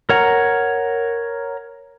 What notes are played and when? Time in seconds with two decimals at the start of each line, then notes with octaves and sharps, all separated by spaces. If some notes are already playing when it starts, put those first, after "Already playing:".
0.09 A#4 C#5 F#5 A#5